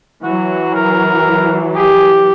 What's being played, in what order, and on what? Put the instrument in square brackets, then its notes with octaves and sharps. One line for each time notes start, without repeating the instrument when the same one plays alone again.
[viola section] E3 F#3 [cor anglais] F#4
[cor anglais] A#4
[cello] G4 [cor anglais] G#4